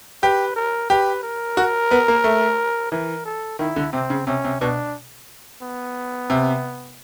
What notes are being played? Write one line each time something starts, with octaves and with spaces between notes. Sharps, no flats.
G4 B4
A#4
G4 B4
A#4
F#4
B3
A#3
A3
E3 A#4
A4
D#3 E4
D3
C3 C4
C#3
C3 C#4
C3
B2 D4
B3
C3